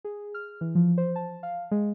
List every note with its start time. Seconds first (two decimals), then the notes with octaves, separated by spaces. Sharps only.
0.05 G#4
0.34 F6
0.61 E3
0.75 F3
0.98 C5
1.16 A5
1.43 F5
1.71 G#3